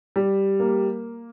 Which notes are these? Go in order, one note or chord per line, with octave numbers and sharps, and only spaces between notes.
G3
A#3